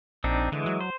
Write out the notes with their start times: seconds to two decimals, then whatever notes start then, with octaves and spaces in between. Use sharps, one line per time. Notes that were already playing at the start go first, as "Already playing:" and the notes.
0.24 A#1 C4 D4 D#4
0.52 D3 E3 G#3
0.66 F#3
0.81 C5